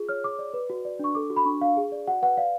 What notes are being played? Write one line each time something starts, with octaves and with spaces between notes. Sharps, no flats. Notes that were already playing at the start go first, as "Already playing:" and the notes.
Already playing: F4 G#4
C#5 F6
G#4 D6
D5
B4
F#4
D5
D4 C#6
A4 D6
F#4
B5
D4 C#6
D4 F5
G#4
D5
F#4 F#5
B4 F#5
D5 F5